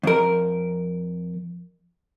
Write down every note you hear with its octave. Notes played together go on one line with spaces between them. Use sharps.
F2 A#4